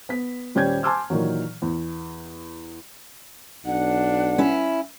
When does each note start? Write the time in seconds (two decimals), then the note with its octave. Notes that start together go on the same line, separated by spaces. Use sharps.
0.09 B3 B6
0.55 D#1 G3 C#4 D5 G6 G#6
0.83 G#5 A5 C6 D6 E6 F6
1.10 A#2 D#3 E3 F#3
1.62 E2
3.66 B1 D4 F#5
4.38 C#4 E4